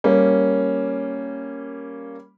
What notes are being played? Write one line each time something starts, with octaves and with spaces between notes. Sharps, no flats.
G3 A#3 C#4